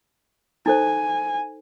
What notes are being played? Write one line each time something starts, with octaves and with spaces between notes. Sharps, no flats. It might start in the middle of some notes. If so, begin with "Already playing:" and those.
D#4 A4 C5 G#5